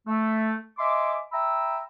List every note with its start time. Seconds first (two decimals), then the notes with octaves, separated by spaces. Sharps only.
0.07 A3
0.79 D#5 E5 G#5 C6 D6
1.32 E5 G5 A#5 B5 E6